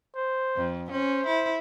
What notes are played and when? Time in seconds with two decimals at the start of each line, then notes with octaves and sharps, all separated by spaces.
0.16 C5
0.56 F2
0.91 C#4 C5
1.26 E4